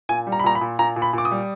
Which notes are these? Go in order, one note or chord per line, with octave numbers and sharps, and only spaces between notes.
A#2 G#5
G3
A#5
B5
A#2 A#5
B5
A#2
A#2 A#5
A#2
B5
A#2 D6
D#6
G3